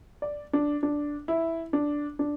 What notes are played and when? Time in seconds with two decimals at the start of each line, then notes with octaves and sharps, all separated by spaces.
0.22 D5
0.53 D4
0.83 D4
1.28 E4
1.73 D4
2.19 D4